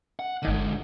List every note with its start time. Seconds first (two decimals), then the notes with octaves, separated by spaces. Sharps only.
0.19 F#5
0.42 G1 D3 D#3 G#3 D#7